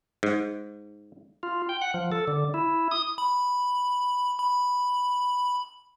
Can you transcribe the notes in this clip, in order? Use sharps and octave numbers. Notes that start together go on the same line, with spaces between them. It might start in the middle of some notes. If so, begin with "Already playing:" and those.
G#2
F4
G5
F#5
F3
A4
D3
E4
D#6
B5
B5